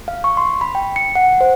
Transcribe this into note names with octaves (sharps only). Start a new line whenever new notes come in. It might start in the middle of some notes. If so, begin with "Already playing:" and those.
F5
C#6
C6
B5
G5
C#7
F#5
C5